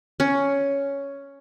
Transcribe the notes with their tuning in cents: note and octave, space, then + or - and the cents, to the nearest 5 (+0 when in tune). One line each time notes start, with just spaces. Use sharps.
C#4 +5